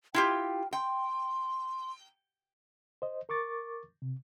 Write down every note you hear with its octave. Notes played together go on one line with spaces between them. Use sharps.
E4 F4 G4 G5
G5 C6
C5 D#5
A#4 C#6 D6 A6
C3